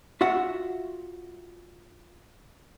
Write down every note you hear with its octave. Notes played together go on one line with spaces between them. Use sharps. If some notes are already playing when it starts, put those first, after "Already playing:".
F4 F#4 E5 F#5